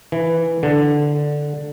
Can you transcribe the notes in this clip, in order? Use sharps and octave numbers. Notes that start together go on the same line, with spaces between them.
E3
D3